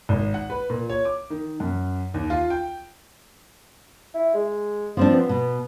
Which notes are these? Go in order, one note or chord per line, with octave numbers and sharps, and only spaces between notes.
G#1
F#5
B4
A#2
C#5
D6
D#3
F#2
D#2
F4
G5
E4
G#3
F3 C4 D4
B3
B2